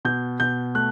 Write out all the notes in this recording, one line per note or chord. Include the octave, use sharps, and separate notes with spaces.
B2 G6
B2 G6
A3 F#6